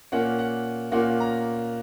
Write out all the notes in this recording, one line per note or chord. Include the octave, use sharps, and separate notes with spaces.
A#2 A#3 C#4 F#5
F#5
A#2 A#3 C#4 F#5
A#5